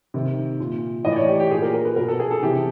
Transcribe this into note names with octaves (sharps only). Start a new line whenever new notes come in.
C3 D#3
A#2
A2 E3 D#5
D5
C#5
G4
G4
A#2 G#4
A#4
A#4
B4
B2 A#4
A4
G#4
A4
C3 E3 G4